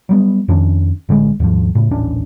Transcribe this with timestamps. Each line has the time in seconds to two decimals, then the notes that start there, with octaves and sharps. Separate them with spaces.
0.09 F#3 G3 B3
0.48 F2 D#3 C#4 D4
1.09 A1 D3 E3 G#3
1.40 D#2 G#2 F3
1.75 A2 C#3
1.91 D#1 A1 C#4 D4